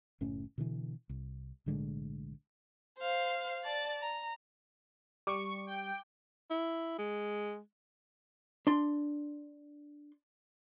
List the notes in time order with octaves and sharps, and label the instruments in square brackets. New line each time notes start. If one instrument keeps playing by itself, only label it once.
[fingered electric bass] F#1 A2 C#4
B2 D3 E3
C2
B1 A2 D3 G#3
[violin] C5 F5
D5 A5
A#5
[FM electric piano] G3 [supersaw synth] C#6 [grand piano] D6
[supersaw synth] G5
[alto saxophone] E4
G#3
[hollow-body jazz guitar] D4 C6